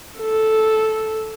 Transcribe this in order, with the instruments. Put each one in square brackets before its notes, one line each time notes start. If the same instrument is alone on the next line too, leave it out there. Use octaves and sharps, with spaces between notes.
[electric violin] A4